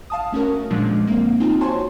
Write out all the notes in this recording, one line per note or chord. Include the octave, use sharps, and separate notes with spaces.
F5 A5 D#6
A3 C#4 F#4 A#4
A#2 D3 F3 G#3 D4
A#3 C4
C4 D#4 F4
F#4 C5 C#5 G#5 A5 C6